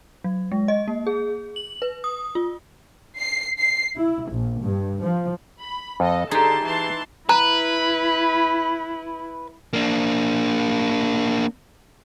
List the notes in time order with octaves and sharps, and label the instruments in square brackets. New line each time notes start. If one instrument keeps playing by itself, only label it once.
[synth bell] F#3
G#3
D#5
A#3
G#4
F#7
B4
D#6
F4
[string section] C7
C7
E4
A#1
G2
F3
[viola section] B5
[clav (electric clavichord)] F2 [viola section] A4 D#5
[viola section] D3 A5 C6 [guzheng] D#4 [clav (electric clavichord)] G4 G#4
[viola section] E3 A5 C6
[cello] E4 [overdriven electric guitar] B4 [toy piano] A#5
[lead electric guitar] A#3 D4